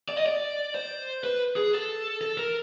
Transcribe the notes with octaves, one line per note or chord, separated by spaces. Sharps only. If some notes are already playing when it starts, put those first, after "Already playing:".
D5
D#5
D5
C5
B4
G#4
A4
A4
A#4